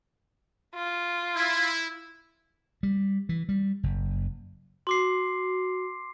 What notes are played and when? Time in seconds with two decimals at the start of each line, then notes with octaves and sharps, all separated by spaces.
0.75 F4
1.36 E4
2.83 G3
3.29 E3
3.49 G3
3.83 F#1
4.87 F#4 C6 D6 C7